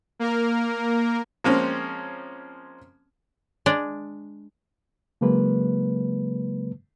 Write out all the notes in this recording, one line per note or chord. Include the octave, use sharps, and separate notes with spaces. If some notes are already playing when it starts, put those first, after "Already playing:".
A#3 A#4
F3 G#3 A#3 C4 C#4
G#3 D4 D5
C#3 F#3 G#3 A#3 B4